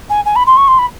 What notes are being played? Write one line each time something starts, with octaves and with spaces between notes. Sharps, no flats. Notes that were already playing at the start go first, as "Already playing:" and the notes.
G#5
G#5
B5
C6
C#6
C6
B5